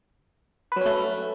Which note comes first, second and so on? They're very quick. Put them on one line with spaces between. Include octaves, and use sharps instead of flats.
B4 F#3 C#4 A3